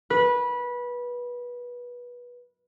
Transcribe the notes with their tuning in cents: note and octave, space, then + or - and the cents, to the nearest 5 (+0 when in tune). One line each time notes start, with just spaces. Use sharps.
B4 -20